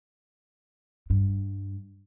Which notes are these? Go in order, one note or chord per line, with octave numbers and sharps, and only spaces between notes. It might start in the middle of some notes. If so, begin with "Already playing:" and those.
G2